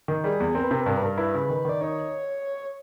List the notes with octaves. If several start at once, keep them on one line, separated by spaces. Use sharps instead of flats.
D#3
G3 G#4
E2
C4 A#4
B4
C3 A#4
B4
G2 A#4
B4
G2 A#4
E4 B4
C#3
D#3
D#3 D5
D#4 C#5